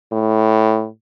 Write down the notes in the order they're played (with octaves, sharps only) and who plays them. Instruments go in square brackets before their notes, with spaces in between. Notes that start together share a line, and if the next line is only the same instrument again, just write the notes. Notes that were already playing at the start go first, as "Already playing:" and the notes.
[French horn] A2